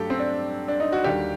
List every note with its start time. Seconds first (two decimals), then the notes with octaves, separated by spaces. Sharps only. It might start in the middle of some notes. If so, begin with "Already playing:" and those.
Already playing: G2 F#3 A3 G4 A4
0.10 C4
0.19 D4
0.68 D4
0.80 D#4
0.92 F#4
1.04 D#2 D3 G3 G4